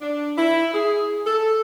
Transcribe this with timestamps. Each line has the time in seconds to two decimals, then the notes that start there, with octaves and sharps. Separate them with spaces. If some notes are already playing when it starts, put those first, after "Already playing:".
0.01 D4
0.38 E4
0.74 G#4
1.26 A4